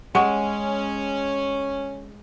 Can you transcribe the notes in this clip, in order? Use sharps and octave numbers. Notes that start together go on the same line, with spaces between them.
G#3 C#4 F#5 C#6